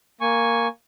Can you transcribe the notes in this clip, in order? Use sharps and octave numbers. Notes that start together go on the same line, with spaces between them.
A#3 G#5 C#6